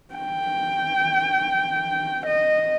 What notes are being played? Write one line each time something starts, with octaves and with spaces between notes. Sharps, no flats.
G5
D#5